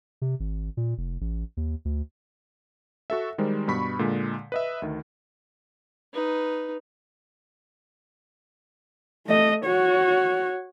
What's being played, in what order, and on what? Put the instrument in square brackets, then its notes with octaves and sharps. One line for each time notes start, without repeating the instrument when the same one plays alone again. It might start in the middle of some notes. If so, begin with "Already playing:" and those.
[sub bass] C3
G#1
A#2
F1
A1
D#2
D2
[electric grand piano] F#4 A4 E5
D#3 G3 G#3 A#4 C5
G2 B2 B5 C#6 B6
A#2 D3 G#3
B4 D#5 E5
D2 D#3
[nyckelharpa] D#4 B4
[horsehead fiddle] A3 D#5
F#4 C#5